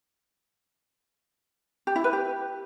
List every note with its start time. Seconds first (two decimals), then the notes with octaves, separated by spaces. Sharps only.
1.87 G4
1.96 E4
2.04 B4
2.13 G4